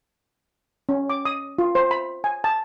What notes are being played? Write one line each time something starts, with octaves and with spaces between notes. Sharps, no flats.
C#4
D6
D#6
F4
C5
B5
G#5
A5